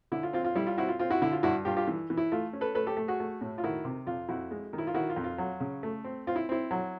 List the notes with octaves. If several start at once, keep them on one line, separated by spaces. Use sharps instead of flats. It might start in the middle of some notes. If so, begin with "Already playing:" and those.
D3 E4
F4
C4 F4
F4
G3 E4
F4
C4 E4 F#4
F4
C4 F4
E4 F#4
D3 E4
F4
G2 E4 F#4
G2 F4 G4
F4 G4
E3
E3
E4
A3 F4
C#4
A4 B4
A3 A4 B4
G4 A4
A3
F#4 G#4
A3
A2
F4
D#3 E4 F#4
C3
F2 F4
F2 E4 F#4
G#3
D#3
E4
F4
D#3 E4 F#4
F4
F2
F4
F#3
C#3
A3
C4
C4 F4
E4
C4 E4
F#3